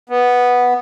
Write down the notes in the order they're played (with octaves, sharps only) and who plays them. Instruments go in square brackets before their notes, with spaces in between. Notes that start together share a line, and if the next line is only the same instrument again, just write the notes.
[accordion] B3